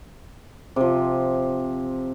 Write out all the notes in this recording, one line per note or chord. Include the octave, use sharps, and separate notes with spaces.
C3 F3